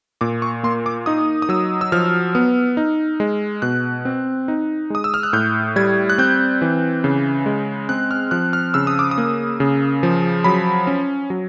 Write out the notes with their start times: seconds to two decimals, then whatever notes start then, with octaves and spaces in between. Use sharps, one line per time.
0.21 A#2 D6
0.42 C#6
0.63 A#3 C6
0.86 D6
1.06 D#4 D#6
1.42 D#6
1.49 F#3 E6
1.81 E6
1.92 F3 F6
2.35 B3
2.77 D#4
3.20 G#3
3.62 B2 F#6
4.05 C4
4.48 D#4
4.90 G#3 D#6
5.04 E6
5.14 F6
5.23 F#6
5.33 A2 G6
5.76 G3 G#6
6.09 F#6
6.18 C4 G6
6.62 E3
7.04 C#3
7.46 G#3
7.89 C4 F#6
8.11 F6
8.31 F3 F#6
8.53 F6
8.74 C#3 E6
8.87 D#6
8.99 D6
9.11 D#6
9.18 A#3
9.60 C#3
10.03 F3
10.44 F#3 B5
10.87 C#4
11.30 F#3